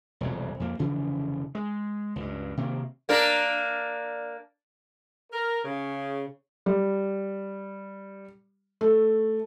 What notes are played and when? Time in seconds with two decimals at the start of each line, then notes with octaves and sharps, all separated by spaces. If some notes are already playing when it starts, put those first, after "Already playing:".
0.21 E1 C2 F2
0.60 F2 A#3
0.79 F1 C#3 E3 F3
1.55 G#3
2.16 C#2 G2
2.57 C3 D#3 A#3
3.09 A#3 D4 A#4
5.31 A#4
5.65 C#3
6.66 G3
8.81 A3